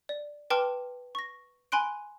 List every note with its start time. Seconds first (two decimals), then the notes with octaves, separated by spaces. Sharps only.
0.09 D5
0.50 B4 G5 A5 C6 D6 F6
1.15 C#6 A#6
1.72 G#5 B5 C6 F#6 D7